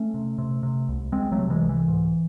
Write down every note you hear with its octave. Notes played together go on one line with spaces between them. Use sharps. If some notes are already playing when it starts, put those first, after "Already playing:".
Already playing: A3 C#4
C3
C3
C3
C2
C2 G#3 C4
F#3 A3
C3
E3 G#3
C2
E3
G#2